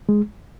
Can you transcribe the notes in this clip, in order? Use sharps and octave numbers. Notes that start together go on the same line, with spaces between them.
G#3